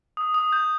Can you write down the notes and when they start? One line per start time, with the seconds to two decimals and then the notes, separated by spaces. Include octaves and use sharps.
0.17 D#6
0.34 D#6
0.52 G6